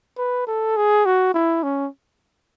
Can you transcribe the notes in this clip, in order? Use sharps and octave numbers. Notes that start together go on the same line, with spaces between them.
B4
A4
G#4
F#4
E4
C#4